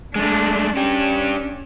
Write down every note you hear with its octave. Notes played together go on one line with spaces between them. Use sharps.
G#3 A3 D4
C#4 D4 G4